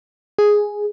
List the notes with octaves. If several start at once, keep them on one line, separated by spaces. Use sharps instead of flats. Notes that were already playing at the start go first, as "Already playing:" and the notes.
G#4